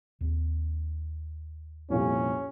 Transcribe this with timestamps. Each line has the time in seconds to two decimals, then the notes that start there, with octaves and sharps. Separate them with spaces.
0.21 D#2 C4
1.90 C2 F2 A#2 C#4